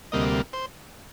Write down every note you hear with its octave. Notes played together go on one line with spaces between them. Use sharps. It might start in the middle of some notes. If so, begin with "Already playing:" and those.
D2 C3 G3 A#3 D#5
C5